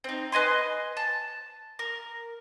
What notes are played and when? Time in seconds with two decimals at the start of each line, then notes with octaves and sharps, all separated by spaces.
0.04 C4 D#4
0.32 B4 D#5 G#5 C6
0.97 A5
1.79 A#4